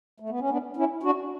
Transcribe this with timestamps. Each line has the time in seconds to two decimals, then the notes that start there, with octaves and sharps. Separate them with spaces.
0.20 A3
0.29 B3
0.40 C#4
0.50 B3 D4
0.76 C#4 E4
1.03 D4 F#4